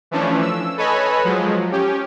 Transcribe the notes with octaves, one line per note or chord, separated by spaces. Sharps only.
E3 F3 A3 C#4 D4
E6
A4 B4 C#5 D#5 G#5 B5
F3 F#3 G#3
C#4 G4